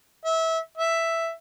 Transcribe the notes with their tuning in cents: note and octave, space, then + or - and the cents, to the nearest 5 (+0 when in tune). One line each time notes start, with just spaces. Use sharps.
E5 -25
E5 +5